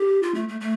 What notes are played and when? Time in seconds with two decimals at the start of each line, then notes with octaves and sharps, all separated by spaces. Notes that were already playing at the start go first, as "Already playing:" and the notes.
Already playing: G4
0.23 F4
0.35 A3
0.49 A3
0.61 A3